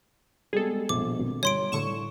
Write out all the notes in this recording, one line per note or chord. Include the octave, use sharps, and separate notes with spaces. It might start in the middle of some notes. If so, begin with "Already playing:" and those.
G3 G#3 B3 G#4 A4
A#1 B2 D6
G#1
G1 C#5 C6 D7
A2 D3 A3 C#6 E7